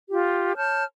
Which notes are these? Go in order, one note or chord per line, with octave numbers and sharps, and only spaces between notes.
F4 G4
C#5 A5 F6 G6